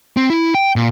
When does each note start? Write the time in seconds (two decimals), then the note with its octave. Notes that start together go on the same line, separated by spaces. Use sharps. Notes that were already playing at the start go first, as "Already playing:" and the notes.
0.17 C4
0.30 E4
0.55 G5
0.76 A#2